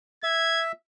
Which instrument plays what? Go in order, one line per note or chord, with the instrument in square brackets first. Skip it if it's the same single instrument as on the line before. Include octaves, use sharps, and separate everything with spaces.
[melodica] E5 [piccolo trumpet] G#6